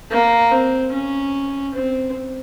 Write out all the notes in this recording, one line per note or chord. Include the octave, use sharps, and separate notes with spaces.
A#3
C4
C#4
C4